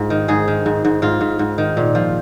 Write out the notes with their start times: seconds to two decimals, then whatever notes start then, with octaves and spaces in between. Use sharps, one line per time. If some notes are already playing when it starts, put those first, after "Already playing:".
Already playing: G#2 F4
0.10 D#3
0.28 G#2 G#4
0.48 D#3
0.66 G#2
0.85 G#2
1.02 G#2 F4
1.21 G#2
1.39 G#2
1.58 D#3
1.77 A#2
1.95 F3